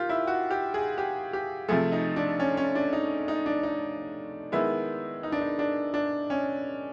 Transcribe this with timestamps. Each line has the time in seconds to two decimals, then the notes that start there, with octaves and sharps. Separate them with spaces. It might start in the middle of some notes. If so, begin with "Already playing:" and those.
Already playing: D#3 F4 G4
0.09 E4
0.27 F#4
0.51 G4
0.74 G#4
0.98 G4
1.33 G4
1.69 C3 F3 A3 G#4
1.92 D#4
2.16 D4
2.40 C#4
2.57 C#4
2.75 D4
2.93 D#4
3.28 D#4
3.46 D4
3.63 D#4
4.52 D#3 G#3 B3 E4
5.23 D#4
5.32 D4
5.41 D#4
5.59 D4
5.94 D4
6.30 C#4